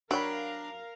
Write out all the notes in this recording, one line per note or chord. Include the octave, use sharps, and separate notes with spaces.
F#3 D4 F#4 A#4 C#5 F5 G5 B5